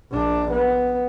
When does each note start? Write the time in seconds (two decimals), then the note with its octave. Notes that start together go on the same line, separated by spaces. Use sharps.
0.11 A#1 D4
0.52 B3